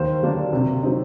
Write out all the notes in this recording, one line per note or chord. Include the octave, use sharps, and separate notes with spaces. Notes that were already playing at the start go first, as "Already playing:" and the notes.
Already playing: D#2 C5
D3 F#3 A#3 D4
C3
F#3 C4 D#4